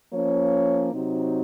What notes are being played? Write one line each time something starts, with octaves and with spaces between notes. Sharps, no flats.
F3 A#3 C#4 C#5
C3 F#3 C4 D#4